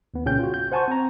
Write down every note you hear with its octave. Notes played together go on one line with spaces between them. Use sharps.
D#2 B3
C2 A#2 C#3 C#4 G5 G6
F4 F#4
G6
C5 F#5 G#5 A5 C6 C#6
C4 A#5